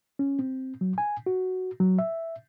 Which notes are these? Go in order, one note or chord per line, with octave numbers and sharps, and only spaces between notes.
C#4
C4
F#3
G#5
F#4
F#3
E5